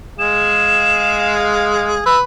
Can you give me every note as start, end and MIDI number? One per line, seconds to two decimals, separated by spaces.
0.19 2.03 56
0.19 2.03 68
0.19 2.03 77
0.19 1.33 100
2.06 2.21 71
2.06 2.17 88